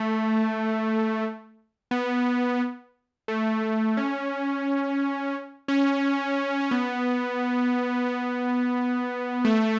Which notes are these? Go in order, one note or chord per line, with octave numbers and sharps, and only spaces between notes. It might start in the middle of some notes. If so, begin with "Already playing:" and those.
Already playing: A3
B3
A3
A3
C#4
C#4
C#4
B3
B3
A3